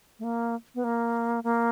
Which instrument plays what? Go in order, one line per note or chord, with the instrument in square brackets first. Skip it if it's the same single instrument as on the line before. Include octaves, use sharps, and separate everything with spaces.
[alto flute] A3
A#3
B3
A#3
A#3